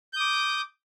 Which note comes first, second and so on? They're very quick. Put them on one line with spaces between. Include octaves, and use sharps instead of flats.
G6 D#6 D6